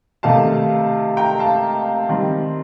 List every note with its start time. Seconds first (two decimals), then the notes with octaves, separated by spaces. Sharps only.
0.23 C3 D#3 A3 D#4 F5 A5
1.17 G5 A#5
1.39 F5 A5
2.09 D#3 G3 C4